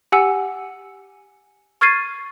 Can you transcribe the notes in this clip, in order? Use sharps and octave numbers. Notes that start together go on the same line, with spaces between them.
G4 F#5 G#5 E6 C#7
C#6 F6 G#6 A6 C7 D#7